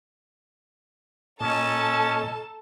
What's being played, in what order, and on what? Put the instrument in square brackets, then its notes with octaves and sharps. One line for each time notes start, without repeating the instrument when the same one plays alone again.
[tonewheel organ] A#2 D#5 [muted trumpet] C#4 [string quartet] A4 A5 A#5